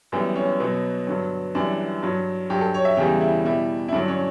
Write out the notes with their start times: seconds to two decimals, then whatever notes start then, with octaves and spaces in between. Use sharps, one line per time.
0.12 F#2 E3 G3 B3
0.36 C#4
0.60 B2 F#3 B3
1.07 G2 D3 F#3
1.55 F#2 E3 G3 D4
2.02 G2 F#3
2.50 G2 F#3 G4
2.61 A4
2.74 C#5
2.85 E5
2.97 E2 C#3 E3 G3 G4
3.21 E4
3.44 B2 G3 E4
3.88 E4
3.92 G2 D3 F#3 D4
4.08 C#4